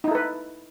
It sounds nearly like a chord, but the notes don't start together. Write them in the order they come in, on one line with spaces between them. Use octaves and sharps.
D#4 E4 A4 B4